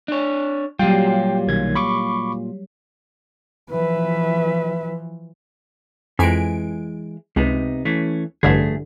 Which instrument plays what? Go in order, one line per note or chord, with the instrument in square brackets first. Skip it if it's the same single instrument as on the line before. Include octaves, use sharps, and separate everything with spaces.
[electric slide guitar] D4 C#5
[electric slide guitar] A#2 F4 [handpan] F#3 G3 [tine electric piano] G5 C7
[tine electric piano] B1 D#3 G#6
B5 C#6 D6
[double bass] E3 F3 [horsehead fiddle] B4 E5
[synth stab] F2 G#5 D7 [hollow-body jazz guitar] E3 G#3
[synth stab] C#2 [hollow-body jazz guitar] C3 B3 D#4
[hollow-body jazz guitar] E3 A3 C#4
[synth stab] A1 G2 D3 [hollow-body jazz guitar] F3 A3 G#4